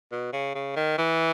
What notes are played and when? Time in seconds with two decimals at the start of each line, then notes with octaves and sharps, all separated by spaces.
0.12 B2
0.33 C#3
0.55 C#3
0.77 D#3
0.98 E3